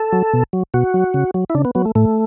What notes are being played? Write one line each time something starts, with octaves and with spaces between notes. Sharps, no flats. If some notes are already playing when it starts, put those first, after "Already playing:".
Already playing: A4
F#3
B2
F#3
B2 F#4
F#3
C#3
F#3
E4
C#3 D4
B3
F#3 B3
A3
A2 A3